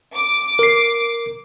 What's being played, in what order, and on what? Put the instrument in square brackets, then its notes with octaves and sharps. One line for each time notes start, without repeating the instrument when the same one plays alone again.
[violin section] D6
[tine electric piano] A#4 C7